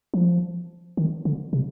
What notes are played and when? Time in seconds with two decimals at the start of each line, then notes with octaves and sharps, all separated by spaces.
0.14 F3
0.97 D#3
1.25 D3
1.53 C3